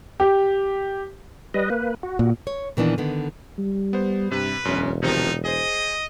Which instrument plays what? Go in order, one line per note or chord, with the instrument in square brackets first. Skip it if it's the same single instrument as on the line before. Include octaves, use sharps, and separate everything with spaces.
[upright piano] G4
[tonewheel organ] G3 B4 D#5
A#3 B4
F#4
[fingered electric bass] A#2
[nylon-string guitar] C#5
A#2 D#3 E3 A#3 B3 D4
D3 D#3 B3
[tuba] G3
[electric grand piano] B3 C5
[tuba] G2 [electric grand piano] C3 [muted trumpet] B4
[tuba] E1 [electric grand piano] F#2 C#4
[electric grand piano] C3 D#3 F3 [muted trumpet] D#4
[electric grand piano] G#4 C5 [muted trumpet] D#5